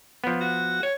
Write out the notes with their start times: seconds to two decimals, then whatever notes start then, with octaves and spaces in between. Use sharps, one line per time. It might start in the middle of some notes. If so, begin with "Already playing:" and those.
0.24 F3 B3
0.41 F#4
0.83 C#5